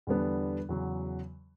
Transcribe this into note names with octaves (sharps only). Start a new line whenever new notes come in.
E2 D3 G3 B3 D4
E2 C#3 F#3